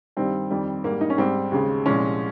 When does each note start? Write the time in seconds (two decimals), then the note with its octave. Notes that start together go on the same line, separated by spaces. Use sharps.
0.17 G2 D#3 G3 C4
0.51 F2 D#3 G3
0.84 G#2 G3 A#3
1.01 D#4
1.10 C#4
1.18 G#2 G3 C4
1.52 D#2 C#3 G#3
1.86 C2 A#2 F3 G#3 C#4